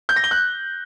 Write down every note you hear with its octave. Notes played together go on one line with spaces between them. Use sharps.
G6
A#6
G7
F#6